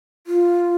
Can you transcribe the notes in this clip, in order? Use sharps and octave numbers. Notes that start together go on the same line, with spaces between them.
F4